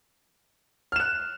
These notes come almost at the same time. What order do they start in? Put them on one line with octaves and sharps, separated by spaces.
F6 E7 F#6